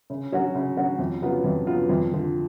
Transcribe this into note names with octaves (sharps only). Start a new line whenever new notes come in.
C#3
F#3 C#4 F#4
C#3
F#3 C#4 F#4
F2
C#3 F#3 B3 F4
F2
C#3 F#3 B3 F4
F2
D3 F3